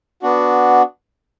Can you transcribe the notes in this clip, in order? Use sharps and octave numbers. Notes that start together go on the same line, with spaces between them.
B3 D4 F#4